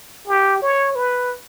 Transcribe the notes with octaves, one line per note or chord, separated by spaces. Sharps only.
G4
C#5
B4